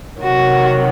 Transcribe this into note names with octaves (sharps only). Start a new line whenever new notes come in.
C3 D#3 F#3 F#4